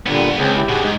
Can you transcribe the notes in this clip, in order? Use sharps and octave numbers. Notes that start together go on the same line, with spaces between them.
G2 A#2 D3 G3 B3
C#2 C4 G#4
E4 G4
G#2 B2 G4 G#4 F#5
E2 G#2